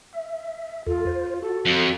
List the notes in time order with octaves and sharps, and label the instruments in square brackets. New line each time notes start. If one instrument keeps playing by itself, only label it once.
[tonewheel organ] E5
[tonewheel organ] E2 A4 [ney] F4
[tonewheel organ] C5
[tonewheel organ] F#4 [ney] A4
[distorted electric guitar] F2